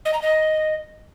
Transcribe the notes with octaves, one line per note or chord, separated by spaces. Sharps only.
D#5
A#5
D#5